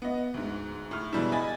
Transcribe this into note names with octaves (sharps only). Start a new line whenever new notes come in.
B3 D#5
D2 G#2
A2 F6
B2 E3 G3 G#3 E4
D#5 G#5 B5 A6